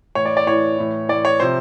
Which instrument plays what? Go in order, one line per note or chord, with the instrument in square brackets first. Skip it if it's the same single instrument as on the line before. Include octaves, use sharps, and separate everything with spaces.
[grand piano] A2 E3 C#5
D5
D5
A2 E3 C#5
A2 E3
A2 E3 D5
C#5
C3 F3 C5